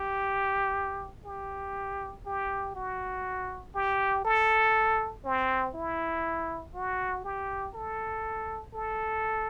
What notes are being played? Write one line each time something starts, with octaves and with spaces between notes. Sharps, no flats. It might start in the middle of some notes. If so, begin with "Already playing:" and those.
Already playing: G4
G4
G4
F#4
G4
A4
C4
E4
F#4
G4
A4
A4